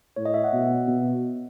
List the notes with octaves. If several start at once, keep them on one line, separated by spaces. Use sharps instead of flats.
A2 C#5
D#5
E5
F#5
B2
B2